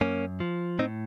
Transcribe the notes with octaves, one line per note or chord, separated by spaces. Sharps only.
F#2 A#3 C#4
F3
A2 C4 D#4